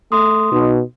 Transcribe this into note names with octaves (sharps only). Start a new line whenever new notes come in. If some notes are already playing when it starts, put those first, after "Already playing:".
A3 C6 D#6
B2 D#4